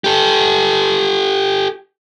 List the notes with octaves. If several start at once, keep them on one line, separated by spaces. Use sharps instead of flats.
G4 A4